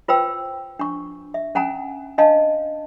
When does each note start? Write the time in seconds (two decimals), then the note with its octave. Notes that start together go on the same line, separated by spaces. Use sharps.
0.08 F4 B4 C5 G5 E6
0.79 D4 C#6
1.34 E5
1.55 C#4 F#5 G#5 A#5
2.18 D4 D#5 F5 A5